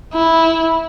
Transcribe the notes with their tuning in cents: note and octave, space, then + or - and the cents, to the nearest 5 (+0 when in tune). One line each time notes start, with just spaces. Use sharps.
E4 -10